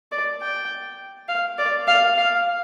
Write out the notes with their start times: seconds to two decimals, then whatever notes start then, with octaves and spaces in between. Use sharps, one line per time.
0.12 D5
0.41 G5
1.29 F5
1.59 D5
1.88 F5
2.18 F5